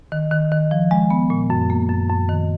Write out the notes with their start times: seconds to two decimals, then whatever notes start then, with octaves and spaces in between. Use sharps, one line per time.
0.12 D#3
0.31 D#3
0.52 D#3
0.71 F3
0.91 G#3
1.10 B3
1.30 A#2
1.50 F#2
1.70 A#3
1.90 F#2
2.09 F#2
2.29 D#3